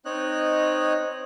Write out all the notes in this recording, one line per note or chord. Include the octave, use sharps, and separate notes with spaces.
C4 D#4 C#5 D#5 F#6